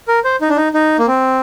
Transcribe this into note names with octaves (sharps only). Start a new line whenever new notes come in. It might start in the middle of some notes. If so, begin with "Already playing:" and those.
A#4
C5
D#4
D4
D#4
D#4
A#3
C4